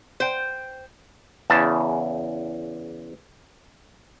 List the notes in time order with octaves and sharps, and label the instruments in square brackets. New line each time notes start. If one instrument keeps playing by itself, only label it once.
[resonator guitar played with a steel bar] C5 G5
[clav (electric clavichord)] E2 C#3 A5